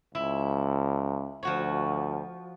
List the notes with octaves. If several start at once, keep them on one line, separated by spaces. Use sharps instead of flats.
C#2 E4
D2 F3 F#4 C#5